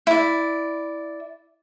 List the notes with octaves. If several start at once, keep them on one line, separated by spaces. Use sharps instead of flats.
E4 D5